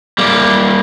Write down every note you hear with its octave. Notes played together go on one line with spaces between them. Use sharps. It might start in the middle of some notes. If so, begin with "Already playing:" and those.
G3 A#3